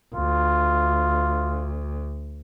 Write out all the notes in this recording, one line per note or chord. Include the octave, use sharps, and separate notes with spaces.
D2 F4